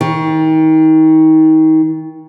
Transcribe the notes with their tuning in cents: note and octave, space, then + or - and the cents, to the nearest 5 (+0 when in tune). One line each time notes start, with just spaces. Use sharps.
D#3 +30